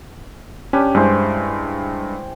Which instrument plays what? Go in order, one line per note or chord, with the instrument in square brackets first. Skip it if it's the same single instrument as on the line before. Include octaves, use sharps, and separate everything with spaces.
[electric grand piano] C#4 [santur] D4 G4 B4
[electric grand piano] G2 G#3 [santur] C#4 E4 C5